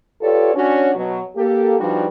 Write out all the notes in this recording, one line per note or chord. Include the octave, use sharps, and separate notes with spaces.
F4 G4 A4 B4 C#5 D5
C#4 D4 F#4
B2 F#3
A#3 G4 A4
F3 G3 D4 D#4 F#4 B4